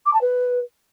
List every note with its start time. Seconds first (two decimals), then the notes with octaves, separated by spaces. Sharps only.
0.06 D6
0.13 A5
0.21 B4